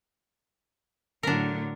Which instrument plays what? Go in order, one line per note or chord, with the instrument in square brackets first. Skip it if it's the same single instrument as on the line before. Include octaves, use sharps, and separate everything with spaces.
[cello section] A2 D3 F#3 [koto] D4 A#4